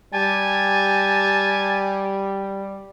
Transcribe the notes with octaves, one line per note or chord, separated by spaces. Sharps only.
G3 G4 G#5 A5